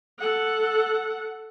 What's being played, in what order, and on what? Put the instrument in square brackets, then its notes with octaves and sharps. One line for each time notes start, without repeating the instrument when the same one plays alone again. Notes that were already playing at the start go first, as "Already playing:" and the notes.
[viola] A4 F#5